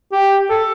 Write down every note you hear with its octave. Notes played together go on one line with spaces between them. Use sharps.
G4
A4